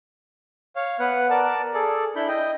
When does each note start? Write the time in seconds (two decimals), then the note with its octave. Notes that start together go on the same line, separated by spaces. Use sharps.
0.76 C#5 F5
0.99 B3 B4 F#5
1.30 A#4 D5 A5
1.74 G#4 A4 D5
2.16 D4 E4 B5 G6
2.28 D#5 G5